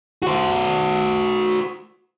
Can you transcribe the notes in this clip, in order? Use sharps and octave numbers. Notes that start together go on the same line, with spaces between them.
F#4 C5